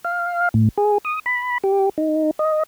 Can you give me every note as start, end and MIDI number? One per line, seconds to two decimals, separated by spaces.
0.05 0.49 77
0.54 0.69 45
0.78 0.98 68
1.05 1.19 87
1.26 1.58 83
1.64 1.89 67
1.98 2.31 63
2.39 2.63 75